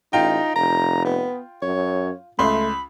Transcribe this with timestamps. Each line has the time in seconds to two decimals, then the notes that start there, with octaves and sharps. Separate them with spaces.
0.13 A1 D#4 F4 G5
0.55 F1 A#5
1.05 B3
1.62 F#2 C#5
2.39 C#2 A3 B5 C6